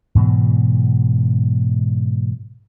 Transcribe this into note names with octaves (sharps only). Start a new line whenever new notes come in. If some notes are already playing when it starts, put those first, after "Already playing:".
G#2 B2 E3 F#3